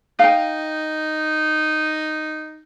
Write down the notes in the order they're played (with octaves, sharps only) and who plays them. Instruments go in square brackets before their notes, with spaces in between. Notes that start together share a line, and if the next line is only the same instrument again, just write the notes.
[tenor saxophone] D#4 [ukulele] F5 G5